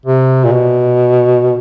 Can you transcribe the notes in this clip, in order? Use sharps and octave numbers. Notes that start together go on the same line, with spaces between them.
C3
A#2
B2